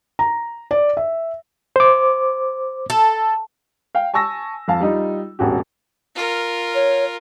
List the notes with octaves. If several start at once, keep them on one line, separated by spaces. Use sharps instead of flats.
A#5
D5
E5
C5 D6
A4
F5 G5
G#5 A5 C#6 E6 A#6
F2 F5 A5
G3 D#4 F4
E1 A1 F#4 G4
F4 A#4
C#5